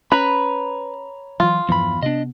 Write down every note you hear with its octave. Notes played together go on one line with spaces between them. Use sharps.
C#4 B4 C#5 A#5 B5
E3 F#3 F4
E2 G2 E3 F3 B5
C3 B3 D4 D#5